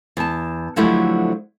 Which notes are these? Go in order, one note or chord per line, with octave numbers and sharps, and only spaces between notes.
E2 A5
D3 F3 F#3 A3 E4 G4